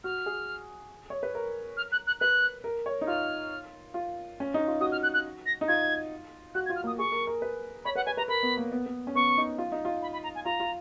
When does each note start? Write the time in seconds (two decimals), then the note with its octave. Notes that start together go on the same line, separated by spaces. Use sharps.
0.04 F#4 F6
0.26 G#4
1.10 C#5
1.23 B4
1.35 A#4
1.77 F6
1.92 F#6
2.07 F#6
2.20 B4 F#6
2.64 A#4
2.86 C#5
3.01 D#4
3.07 F4 F6
3.94 F4
4.40 C#4
4.54 D#4
4.68 F4
4.81 F#4 D#6
4.92 F6
5.03 F#6
5.14 F#6
5.46 A#6
5.61 D#4
5.68 F4 G#6
6.55 F#4 F#6
6.66 G#6
6.70 F4
6.76 F6
6.84 A#3 D#6
6.99 G#4 C#6
7.12 A#4
7.27 A#4
7.42 B4
7.85 C#5 B5
7.95 B4 F#5
8.06 B4 G#5
8.17 B4 A#5
8.28 A#4 B5
8.43 B3
8.57 A#3
8.72 B3
8.86 B3
9.07 C#4
9.15 B3 C#6
9.37 D#4
9.58 F4
9.72 D#4
9.85 F4
10.02 B5
10.13 B5
10.24 A#5
10.35 G#5
10.45 F4 A#5
10.60 F4